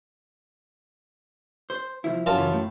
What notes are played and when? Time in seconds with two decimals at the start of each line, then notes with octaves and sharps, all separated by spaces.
1.70 C5
2.04 C2 F3 E4
2.26 F#2 F4 A5
2.38 C#3 E3
2.53 A2